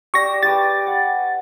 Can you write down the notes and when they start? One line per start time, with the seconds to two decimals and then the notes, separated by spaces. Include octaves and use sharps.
0.14 G4 D5 C#6 E6 A#6
0.43 G4 B4 D6 A6
0.87 F#5